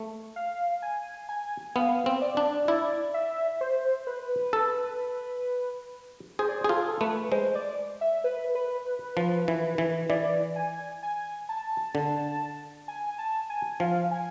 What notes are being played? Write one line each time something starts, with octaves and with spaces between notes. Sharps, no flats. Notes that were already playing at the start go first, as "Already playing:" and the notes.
Already playing: A3
F5
G#5
G#5
B3 F5
C4
D5
D4
E4 D5
E5
C5
B4
A4
G#4 C5
D5
C5
G#4
F4 A4
A4
A3 B4
G#3 C5
D5
E5
B4
B4
B4
F3
E3
E3
E3 D5
G#5
G#5
A5
D3
G#5
A5
G#5
F3 F5
G#5